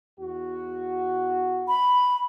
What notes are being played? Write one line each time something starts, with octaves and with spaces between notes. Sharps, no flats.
E2 F#4
B5